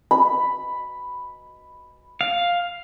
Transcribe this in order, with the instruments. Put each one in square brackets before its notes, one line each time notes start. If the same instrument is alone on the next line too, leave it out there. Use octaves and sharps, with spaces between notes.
[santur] B5
[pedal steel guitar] F5